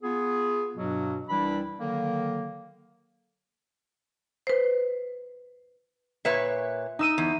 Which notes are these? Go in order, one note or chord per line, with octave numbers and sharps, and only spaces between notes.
B3 F4 G#4
G2 B2 F#3
C2 E3 G3 D4 E4 B5
D3 D#3 F#3 A#3
B4 C5
A#2 B4 C#5 E5
D#4 E6 D#7
E2